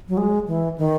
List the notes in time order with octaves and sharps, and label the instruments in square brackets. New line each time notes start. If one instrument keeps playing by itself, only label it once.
[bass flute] F#3
G#3
E3
D#3